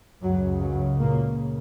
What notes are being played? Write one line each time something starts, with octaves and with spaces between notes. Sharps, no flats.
C#2 F#2 C#3 F#3
F#2 F#3
A#2 A#3